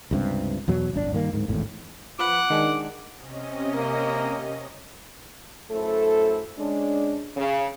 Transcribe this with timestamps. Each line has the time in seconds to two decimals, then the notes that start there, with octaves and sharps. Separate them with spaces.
0.11 C#2 G2 C3
0.68 E2 B2 F#3
0.93 D1 G1 C#4 D4
1.12 G2 D#3 A#3
1.34 D1 G#2
1.48 G#1 E2 A2
2.19 F3 B4 F#5 D6
2.50 D#3 G#3 D4
3.17 C3 C#4 D#5
3.75 A#3
5.70 F#2 A3 E4 A4 C5
6.57 G#3 C#4 D4
7.36 C#3